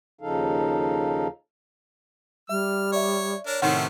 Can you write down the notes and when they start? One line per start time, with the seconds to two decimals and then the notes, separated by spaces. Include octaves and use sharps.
0.21 D#2 C#3 F3 D#4 A4 F5
2.49 G3 E5 F6
2.93 C#5 D5 E5
3.47 D4 A#4 C#5
3.62 A2 C3 D#3 A3 C#4 C5 F#5